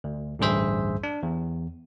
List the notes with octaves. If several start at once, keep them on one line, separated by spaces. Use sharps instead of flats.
D2
A1 D2 G2 G#4 C5 E5
D4
E2